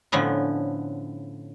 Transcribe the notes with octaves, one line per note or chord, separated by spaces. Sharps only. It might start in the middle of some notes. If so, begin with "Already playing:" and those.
A2 D3 F3 B3 C#4